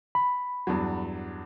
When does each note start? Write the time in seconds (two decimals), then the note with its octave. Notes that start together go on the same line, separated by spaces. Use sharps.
0.15 B5
0.67 E2 G2 F#3